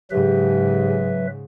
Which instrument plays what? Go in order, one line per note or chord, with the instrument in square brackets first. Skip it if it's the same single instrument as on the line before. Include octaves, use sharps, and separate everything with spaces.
[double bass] G#2 C#3 [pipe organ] F#3 B4 E5 [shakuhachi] G4